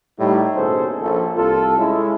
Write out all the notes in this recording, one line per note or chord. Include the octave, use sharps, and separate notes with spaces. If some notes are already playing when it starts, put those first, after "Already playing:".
A2 G3 D#4
D#2 B2 C#4 G#4 A4 C5
A#1 F3 A4
C2 F4 A4
G#3 C#4 E4